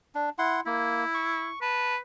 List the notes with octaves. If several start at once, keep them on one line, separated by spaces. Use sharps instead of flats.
D4
E4 F#5 C6
A#3 E4
C#6
B4 A5